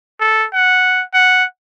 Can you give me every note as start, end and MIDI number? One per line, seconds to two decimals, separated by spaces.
0.20 0.46 69
0.53 1.03 78
1.14 1.44 78